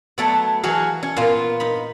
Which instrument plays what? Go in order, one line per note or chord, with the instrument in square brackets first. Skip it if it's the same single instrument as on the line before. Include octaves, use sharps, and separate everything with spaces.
[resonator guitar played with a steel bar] F#3 A3 B3 [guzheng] D5
[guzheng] E3 F5 [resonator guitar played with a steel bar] F#3 F#4 G#4
[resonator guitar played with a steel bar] C#4
[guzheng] A#2 A#3 [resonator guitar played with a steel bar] B3 F4
[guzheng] D#4 B5